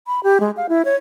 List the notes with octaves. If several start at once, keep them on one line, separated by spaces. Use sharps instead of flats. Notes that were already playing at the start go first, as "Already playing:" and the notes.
B5
G4
G#3
F5
E4
C#5